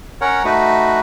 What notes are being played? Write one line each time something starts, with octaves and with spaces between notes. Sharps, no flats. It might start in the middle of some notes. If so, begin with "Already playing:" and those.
C#4 A#4 C#5 F#5
A3 D#4 F#4 B4